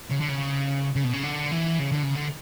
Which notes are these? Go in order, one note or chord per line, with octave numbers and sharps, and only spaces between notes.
C#3
D3
C#3
C#3
B2
C#3
D3
E3
C#3
D3
C#3
D3